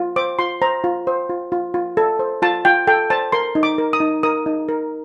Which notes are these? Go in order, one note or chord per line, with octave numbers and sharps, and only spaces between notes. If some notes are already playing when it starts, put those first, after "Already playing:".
Already playing: F4
C5 D6
F4 C6
C5 A#5
F4
C5
F4
F4
F4
A4
C5
F4 A5
F4 G5
A4 G5
C5 A5
A#4 C6
D#4
D6
A#4
D#6
D#4
A#4 D#6
D#4
A#4